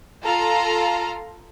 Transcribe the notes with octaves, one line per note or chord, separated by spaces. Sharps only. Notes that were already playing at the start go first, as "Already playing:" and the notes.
F4 A4 F5 A#5